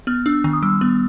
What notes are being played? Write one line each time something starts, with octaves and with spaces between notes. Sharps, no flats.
B3 F6
D4 E6
D#3
D#6
G3 E6
B3